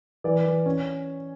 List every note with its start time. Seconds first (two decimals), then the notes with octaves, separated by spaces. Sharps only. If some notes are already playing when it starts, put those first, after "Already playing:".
0.24 E3 D5
0.46 E3
0.66 C#4